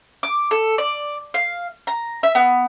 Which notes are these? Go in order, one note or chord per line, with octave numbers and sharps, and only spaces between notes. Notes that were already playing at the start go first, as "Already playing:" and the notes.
D6
A4
D5
F5
A#5
E5
B3